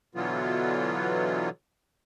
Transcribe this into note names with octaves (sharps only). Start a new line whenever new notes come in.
B2 D3 E3 F#3 B3 F4